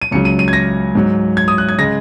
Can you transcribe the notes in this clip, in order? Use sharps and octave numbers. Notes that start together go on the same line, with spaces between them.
D#7
C#2 C#3 F#3 C#7
D#7
D#7
G#6
A#6
G#2 F#3
G#6
D#6
F#6
G#6
C#3 G#3 A#6